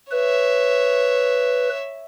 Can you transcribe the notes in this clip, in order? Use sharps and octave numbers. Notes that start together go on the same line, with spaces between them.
B4 C#5 E5